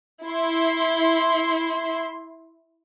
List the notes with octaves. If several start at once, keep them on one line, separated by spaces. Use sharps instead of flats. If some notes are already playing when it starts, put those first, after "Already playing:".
E4 C6